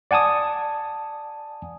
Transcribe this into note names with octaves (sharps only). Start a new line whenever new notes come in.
D5 F#5 G#5 A5 D#6